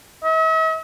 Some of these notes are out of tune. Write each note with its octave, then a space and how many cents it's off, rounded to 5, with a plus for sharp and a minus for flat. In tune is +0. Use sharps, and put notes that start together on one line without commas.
E5 -45